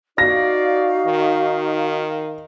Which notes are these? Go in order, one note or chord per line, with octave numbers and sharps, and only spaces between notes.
D#4 F#4 D5 F5 A#6
D#3